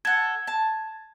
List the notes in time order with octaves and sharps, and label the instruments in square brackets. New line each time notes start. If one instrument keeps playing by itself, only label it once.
[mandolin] A4 F#5 [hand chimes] G#6
[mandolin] A5